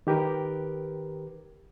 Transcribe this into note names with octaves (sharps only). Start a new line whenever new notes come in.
D#3 G4 A#4 B4